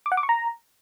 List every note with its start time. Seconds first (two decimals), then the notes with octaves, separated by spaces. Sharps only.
0.06 D6
0.12 F#5
0.17 D6
0.23 C#6
0.29 A#5